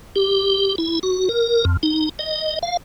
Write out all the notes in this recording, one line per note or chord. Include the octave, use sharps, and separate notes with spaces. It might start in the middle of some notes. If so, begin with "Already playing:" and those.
G4
E4
F#4
A#4
F2
D#4
D#5
F5